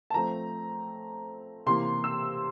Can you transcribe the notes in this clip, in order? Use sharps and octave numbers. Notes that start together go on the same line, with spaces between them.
A5
F3 A3 C4 A#5
C3 E3 A#3 C6
E6